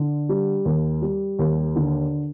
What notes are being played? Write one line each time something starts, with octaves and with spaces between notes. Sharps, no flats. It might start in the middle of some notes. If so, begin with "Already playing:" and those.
Already playing: D3
G3
D#2
G3
D#2
D3